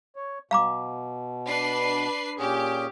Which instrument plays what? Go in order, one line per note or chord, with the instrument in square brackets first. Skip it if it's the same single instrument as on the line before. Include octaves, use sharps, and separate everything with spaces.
[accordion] C#5
[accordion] B2 [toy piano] F5 A#5 D6
[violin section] D4 B4 C7
[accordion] A#2 C#4 G#4 [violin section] G4